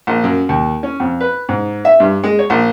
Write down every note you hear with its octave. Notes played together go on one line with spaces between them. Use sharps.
A#1
F#2
D#2
C#4
F2
B4
G#2
E5
G2
G#3
C#5
A#1